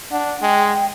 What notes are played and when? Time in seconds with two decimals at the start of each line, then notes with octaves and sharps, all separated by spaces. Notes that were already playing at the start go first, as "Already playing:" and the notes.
0.12 D4 F#5
0.42 G#3 G5